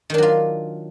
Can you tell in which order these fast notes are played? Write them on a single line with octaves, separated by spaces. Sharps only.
D#3 D4 F#3 F4